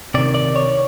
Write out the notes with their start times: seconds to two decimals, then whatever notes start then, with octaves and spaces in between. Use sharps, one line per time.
0.14 C3 D#3 D5
0.34 D5
0.56 C#5